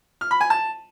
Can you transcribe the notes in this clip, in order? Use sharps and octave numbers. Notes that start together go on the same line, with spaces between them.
F6
B5
G#5
A5